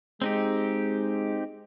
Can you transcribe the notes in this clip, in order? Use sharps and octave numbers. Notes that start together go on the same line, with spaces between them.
G#3 C4 D#4 G4